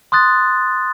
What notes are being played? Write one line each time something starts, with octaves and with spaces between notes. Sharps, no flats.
C6 D#6 F#6 A6